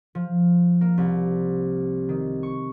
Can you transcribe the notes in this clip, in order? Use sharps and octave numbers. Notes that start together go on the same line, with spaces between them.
F3
A#3
C2
D#3
C#6